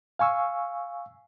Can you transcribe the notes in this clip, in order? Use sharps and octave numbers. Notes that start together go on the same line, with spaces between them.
F5 G#5 C#6 E6